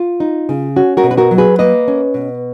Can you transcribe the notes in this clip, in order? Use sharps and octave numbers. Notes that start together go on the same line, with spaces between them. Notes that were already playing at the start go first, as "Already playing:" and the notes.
Already playing: F4
D#4
C#3
C#4 F#4
F#4 A#4
B2
B4
F#4 A#4
F#3
G#4 B4
A#3 B4 D#5
C#4
B2